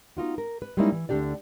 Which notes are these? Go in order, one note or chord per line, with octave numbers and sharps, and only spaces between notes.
B3 D#4 F4 F#4
A#4
B4
G3 G#3 A#3 C#4 D#4 E4
E3
D2 D3 D4 G4 D5